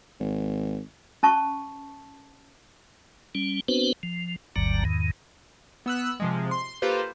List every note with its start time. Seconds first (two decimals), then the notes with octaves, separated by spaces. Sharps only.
0.20 G#1
1.23 C#4 A5 C#6
3.35 G3 C#4
3.68 B3 C4 D4 F#4 B4 C5
4.03 F3
4.56 G1 D2 G2 D3 F#3 A#5
4.85 E2 G#2 D#3
5.86 B3 E6 F#6
6.20 C3 F3 G#3
6.51 C6
6.82 A#3 F4 G4 A4 B4 C5